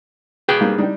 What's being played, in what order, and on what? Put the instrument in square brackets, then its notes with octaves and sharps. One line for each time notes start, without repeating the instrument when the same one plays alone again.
[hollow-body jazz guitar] G#4 B4 G5
[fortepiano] G#2 G3 A#3
G3 D4 D#4